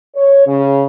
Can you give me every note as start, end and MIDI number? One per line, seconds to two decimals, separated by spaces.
0.15 0.46 73
0.47 0.85 49